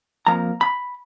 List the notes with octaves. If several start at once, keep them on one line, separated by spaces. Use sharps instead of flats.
F2 F3 A#3 A#5
B5